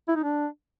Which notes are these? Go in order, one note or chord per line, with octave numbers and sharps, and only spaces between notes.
E4
D#4
D4